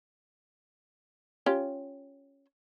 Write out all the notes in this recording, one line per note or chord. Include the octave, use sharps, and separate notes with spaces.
C#4 F4 G4